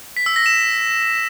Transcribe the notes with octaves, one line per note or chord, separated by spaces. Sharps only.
B6
E6
A#6
E7